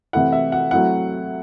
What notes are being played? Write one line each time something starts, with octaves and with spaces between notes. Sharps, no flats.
C3 E3 A3 E4 F#5
E5
F#5
F#3 A3 C4 E4 F#5